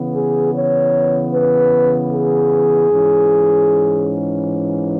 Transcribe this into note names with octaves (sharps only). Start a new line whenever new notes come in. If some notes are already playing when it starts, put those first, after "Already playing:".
Already playing: C#3 E3 B3
G#4
C#5
B4
G#4
G#2 E3 C#4